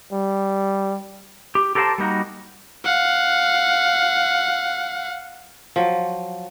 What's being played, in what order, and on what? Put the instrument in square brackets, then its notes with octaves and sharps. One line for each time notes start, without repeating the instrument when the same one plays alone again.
[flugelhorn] G3
[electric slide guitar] G4
G4 A4 A#4 C5 F5 A5
G3 A#3 D#4 F#4
[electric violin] F5 F#5
[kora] F3 F#3